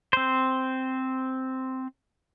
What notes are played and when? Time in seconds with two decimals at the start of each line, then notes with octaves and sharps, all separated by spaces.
0.13 C4 C5